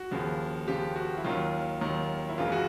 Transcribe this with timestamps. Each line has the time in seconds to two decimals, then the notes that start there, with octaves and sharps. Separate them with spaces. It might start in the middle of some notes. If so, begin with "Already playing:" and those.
Already playing: F#4
0.11 D#2 C#3 F3
0.68 D#2 C#3 F3 G4
0.96 F#4
1.17 E4
1.24 D#2 D#3 F#3 F4
1.81 D#2 D#3 F#3
2.29 E4
2.38 F#1 F#2 C#3 E3 G#3 F4
2.52 F#4